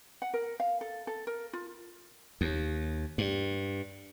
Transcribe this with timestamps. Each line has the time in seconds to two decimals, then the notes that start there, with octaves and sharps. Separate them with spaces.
0.22 F#5
0.34 A#4
0.60 F5
0.81 A4
1.07 A4
1.27 A#4
1.53 F4
2.41 D#2
3.18 G2